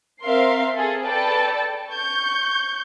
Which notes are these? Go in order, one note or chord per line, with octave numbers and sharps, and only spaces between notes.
C4 A#4 E5 F5 C6 C7
G#4 A4
A4 B4 D5 G5 A5
C#6 G6